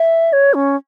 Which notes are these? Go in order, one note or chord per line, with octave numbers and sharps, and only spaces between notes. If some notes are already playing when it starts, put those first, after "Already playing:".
Already playing: E5
C#5
C#4